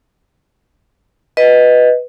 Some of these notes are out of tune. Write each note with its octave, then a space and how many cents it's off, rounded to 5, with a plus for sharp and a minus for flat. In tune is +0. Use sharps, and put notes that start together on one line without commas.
B4 +0 D#5 +0